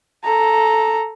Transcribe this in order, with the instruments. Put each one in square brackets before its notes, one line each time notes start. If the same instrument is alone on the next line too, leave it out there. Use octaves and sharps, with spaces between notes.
[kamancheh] A4 A#5